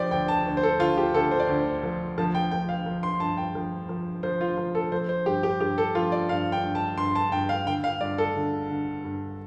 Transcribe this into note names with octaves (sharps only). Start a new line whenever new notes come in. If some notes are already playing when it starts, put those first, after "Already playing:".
Already playing: F3 G4 C5 D5
D2 G5
A5
D2
C5
A4
D2 F4
G4
D2 A4
C5
D5
D2 C5
F3
F3 A5
G5
F3 G5
F5
F3
C6
G2 A5
G5
F3
F3
F3 C5
F4
F3
A4
F3 C5
C5
G2 G4
G4
G2 G4
A4
F3 F4
D5
G2 F5
G5
G2
A5
G2 C6
A5
G2 G5
F5
D3 G5
F5
G2 D5
A4
D3
D3
G2